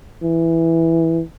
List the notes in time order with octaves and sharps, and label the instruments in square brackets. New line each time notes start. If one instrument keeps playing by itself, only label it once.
[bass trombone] E3